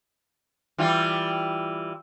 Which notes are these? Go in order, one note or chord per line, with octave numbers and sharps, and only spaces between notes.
E3 G3 F4